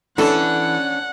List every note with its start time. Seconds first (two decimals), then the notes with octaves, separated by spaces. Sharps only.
0.18 E3 C#4 D4 A4 F#5